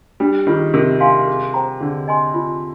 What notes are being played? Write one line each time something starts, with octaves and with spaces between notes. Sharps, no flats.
G3 D4
D#3 F4 G#4
C3 A#4
F5 G#5 C6
G#4
C5 G5 A#5
D3 G#4
D#5 G#5 C6
F4